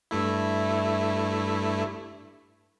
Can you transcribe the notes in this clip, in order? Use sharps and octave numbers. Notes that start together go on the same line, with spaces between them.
G2 A3 E4